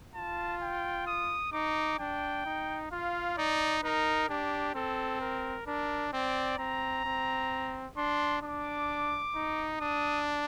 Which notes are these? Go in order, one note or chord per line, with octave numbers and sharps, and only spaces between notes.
F4 A5
G5
D#6
D#4 D6
D4 G5
D#4
F4 F5
D#4 D5
D#4 A#4
D4 G4
C4 A4
A#4
D4 A#4
C4 D5
C4 A#5
C4
D4 C6
D4 D6
D#4
D4 D#6